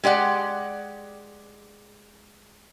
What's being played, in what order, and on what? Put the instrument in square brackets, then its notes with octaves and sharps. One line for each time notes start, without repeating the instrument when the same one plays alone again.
[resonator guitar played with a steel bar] G#3 G4 D5 F#5